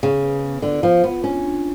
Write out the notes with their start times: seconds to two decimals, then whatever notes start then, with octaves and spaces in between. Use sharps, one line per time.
0.03 C#3 B4
0.23 B4
0.43 B3
0.62 D3 F4
0.82 F3 F4
1.03 B3 F4
1.23 C#4 D4
1.43 D4